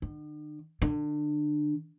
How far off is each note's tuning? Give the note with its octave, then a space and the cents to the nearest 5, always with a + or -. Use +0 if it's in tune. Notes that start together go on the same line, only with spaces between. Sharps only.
D3 +45
D3 +25